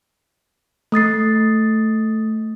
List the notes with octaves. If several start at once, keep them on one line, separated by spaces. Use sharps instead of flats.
A3 D#6 A6 C7